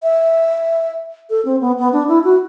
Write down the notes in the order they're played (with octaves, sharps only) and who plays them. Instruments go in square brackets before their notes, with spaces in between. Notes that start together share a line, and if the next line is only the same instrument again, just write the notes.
[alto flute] E5
A4
C4
B3
B3
D4
E4
F#4